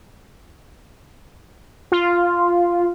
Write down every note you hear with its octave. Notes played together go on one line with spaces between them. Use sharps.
F4